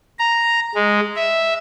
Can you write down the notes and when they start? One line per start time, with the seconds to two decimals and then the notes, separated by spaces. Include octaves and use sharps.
0.19 A#5
0.75 G#3
1.16 E5